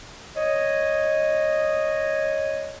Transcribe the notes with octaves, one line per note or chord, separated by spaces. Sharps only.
C#5 D#5